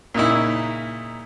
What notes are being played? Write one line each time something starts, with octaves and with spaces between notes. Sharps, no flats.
A#2 C#3 D#4 E4